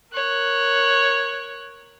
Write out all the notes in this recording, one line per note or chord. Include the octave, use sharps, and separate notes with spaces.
A#4 C#5 F#6